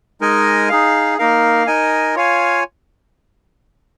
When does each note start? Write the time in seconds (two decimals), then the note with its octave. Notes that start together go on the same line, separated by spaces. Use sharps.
0.21 G#3 D#4 A#4 D#5 G#5
0.69 D#4 G#4 F5
1.18 A#3 D#4 A#4 F5
1.67 D#4 A#4 D#5 G#5
2.15 F4 C#5 F5 G#5